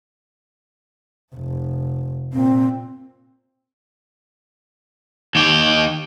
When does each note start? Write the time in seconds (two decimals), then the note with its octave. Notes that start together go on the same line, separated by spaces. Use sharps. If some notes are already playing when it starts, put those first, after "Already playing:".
1.35 F1
2.33 A#2 C4
5.35 D#2 G4